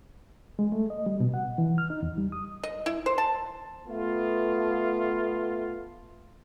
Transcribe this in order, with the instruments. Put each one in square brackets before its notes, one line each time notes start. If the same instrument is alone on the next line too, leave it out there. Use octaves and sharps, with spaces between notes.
[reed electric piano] G#3
A3
D#5
G3
B2
F#5
E3
F6
D#4
E2
G3
D#6
[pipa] D#5
E4
C5
A5
[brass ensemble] A3 B3 F4